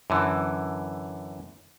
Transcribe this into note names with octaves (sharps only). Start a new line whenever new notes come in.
F#2 D3 E3